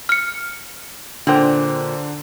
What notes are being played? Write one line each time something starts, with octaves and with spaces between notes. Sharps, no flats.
F6 C#7
A#2 D3 D4 C5 G5